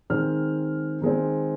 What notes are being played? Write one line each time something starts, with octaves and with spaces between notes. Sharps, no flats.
D#3 G#3 C4 F6
D#3 G#3 C4